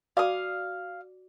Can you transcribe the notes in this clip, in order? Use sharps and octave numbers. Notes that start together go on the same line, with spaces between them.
F#4 D5 F5 D6 D#6